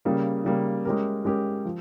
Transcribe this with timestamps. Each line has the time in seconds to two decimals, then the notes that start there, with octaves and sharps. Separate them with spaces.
0.05 C#3 G3 A#3
0.45 C#3 G3 A#3
0.85 G#3 C#4 G4 A#4
1.25 G#3 C#4 G4 A#4
1.65 F3